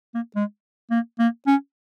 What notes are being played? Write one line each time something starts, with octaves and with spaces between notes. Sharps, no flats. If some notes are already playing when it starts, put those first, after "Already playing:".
A#3
G#3
A#3
A#3
C#4